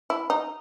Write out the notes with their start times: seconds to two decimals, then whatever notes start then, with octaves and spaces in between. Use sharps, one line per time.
0.10 E4
0.30 D#4